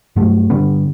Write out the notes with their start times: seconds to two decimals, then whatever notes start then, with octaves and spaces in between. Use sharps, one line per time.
0.16 G2 F#3 A3
0.50 G2 D3 G3 B3